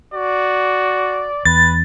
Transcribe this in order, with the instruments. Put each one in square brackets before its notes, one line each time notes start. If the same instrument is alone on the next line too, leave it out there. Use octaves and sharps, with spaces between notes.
[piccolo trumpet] F#4 [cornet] D5
[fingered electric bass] E2 [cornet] B4 [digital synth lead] A6